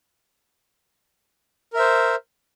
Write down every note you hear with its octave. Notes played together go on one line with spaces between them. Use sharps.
A#4 C5 E5